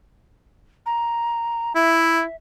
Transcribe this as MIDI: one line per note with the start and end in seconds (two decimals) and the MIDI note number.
0.86 1.73 82
1.75 2.22 64
1.75 2.36 76